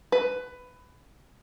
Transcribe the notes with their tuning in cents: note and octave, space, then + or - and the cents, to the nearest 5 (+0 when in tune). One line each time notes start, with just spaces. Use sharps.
B4 +15